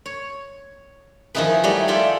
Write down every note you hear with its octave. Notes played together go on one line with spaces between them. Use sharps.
C#5
D#3 F3 D#4 E4 G#4 B4
F#3 G3 A3 G4
F4 G#4 A4 D5 E5